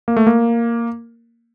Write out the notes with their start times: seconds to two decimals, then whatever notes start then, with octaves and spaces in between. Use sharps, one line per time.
0.08 A#3
0.17 A3
0.27 A#3